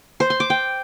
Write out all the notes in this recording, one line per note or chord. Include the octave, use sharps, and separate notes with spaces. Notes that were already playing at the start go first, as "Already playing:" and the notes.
C5
C6
D6
G5